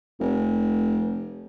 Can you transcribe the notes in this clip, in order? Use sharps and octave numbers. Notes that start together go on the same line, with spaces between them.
F1